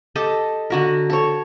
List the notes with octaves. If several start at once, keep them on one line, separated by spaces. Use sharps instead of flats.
G4 A4 D#5
D3 F#4 A#4
A4 C#5